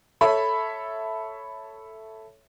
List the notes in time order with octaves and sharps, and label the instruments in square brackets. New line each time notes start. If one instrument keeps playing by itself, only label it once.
[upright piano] A4 C#5 E5 B5